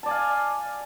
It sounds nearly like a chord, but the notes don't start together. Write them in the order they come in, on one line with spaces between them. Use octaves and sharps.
A5 D5 G#5 F5